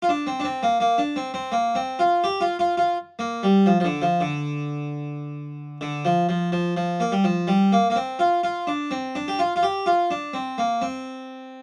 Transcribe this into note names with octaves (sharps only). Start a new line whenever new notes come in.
F4
D4
C4
D4
C4
A#3
A#3
D4
C4
C4
A#3
C4
F4
G4
F4
F4
F4
A#3
G3
F3
F3
D3
F3
D3
D3
F3
F3
F3
F3
A#3
G3
F3
G3
A#3
A#3
C4
F4
F4
D4
C4
D4
G4
F4
F4
G4
F4
D4
C4
A#3
C4